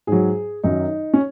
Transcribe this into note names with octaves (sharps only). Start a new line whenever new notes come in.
G#2 F#3 G#4
F#2 D#3 F#3 D#4
C#4